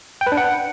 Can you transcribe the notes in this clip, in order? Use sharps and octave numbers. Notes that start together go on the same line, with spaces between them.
G5
B4
D4
F#5